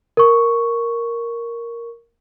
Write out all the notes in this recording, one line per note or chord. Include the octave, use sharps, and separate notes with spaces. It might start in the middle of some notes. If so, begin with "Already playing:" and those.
A#4 C#6